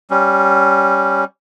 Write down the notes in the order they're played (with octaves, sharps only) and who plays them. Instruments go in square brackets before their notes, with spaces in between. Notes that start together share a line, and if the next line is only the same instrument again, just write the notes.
[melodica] G3 C#4